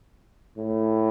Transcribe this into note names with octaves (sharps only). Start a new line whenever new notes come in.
A2